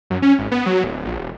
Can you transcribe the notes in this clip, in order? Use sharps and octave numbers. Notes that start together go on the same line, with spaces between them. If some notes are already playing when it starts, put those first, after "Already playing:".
F#2
C#4
G#1
B3
F#3
D1
A#1
E1